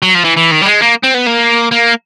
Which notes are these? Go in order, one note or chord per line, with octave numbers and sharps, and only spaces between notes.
F#3
F3
E3
E3
D#3
G3
G#3
A#3
C4
B3
A#3
A#3